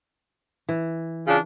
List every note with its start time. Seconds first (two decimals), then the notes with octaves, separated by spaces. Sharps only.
0.69 E3
1.27 C#3 D4 F4